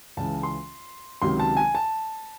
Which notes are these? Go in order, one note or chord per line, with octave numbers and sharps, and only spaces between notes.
C#2 C#3 E3 A5
C6
C#2 C3 D#3 F#3 C6
A5
G#5
A5